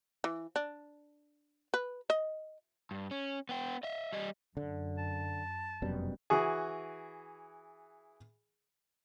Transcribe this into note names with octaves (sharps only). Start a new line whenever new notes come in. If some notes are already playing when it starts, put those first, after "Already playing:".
E3
D4
B4
D#5
G2
C#4
B3 G5
D#5 E5
G3 D#5
F#2 D3
A5
F1 F#2 B2 G3
E3 F#4 G#4